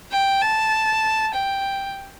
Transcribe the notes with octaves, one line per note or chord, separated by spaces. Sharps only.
G5
A5
G5